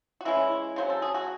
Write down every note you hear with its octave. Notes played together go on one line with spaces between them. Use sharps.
F#4
E3 G#3 C#4 E4
C#3 F#3 C#4 C5
A4
G#4
F#4